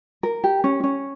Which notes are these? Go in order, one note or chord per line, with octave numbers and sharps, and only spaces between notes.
A#4
G4
C#4
C#4